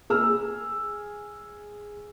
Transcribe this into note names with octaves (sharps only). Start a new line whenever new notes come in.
G#4 E6 F6